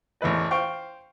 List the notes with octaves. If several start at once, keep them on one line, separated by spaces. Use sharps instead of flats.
A1 E2 A3 B4 D#5
C5 F5 G5 C#6